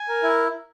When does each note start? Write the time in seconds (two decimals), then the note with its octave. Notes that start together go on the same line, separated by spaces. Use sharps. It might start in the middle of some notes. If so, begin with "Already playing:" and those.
Already playing: G#5
0.09 A#4
0.23 E4